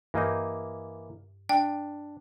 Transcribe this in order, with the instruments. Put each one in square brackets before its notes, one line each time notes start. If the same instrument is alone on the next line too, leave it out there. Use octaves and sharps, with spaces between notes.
[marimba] G2 G6 [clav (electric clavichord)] E3 A#3 D#5
[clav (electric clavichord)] D4 [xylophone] G5